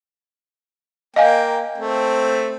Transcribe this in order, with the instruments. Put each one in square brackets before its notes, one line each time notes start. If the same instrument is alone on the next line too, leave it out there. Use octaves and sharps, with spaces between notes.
[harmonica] A#3 G5 [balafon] D#5 F5 G#5
[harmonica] A3 C4